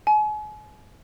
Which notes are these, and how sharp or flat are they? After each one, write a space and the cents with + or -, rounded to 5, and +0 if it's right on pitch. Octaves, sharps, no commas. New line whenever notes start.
G#5 +40